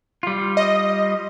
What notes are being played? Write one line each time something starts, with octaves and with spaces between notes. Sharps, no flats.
G3 F4
D#5